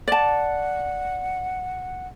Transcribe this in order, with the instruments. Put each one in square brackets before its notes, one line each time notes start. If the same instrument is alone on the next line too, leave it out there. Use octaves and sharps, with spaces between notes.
[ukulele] D5 A5 [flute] F#5